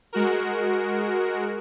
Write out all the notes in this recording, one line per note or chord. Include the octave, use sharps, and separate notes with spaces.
G#3 F#4 A#4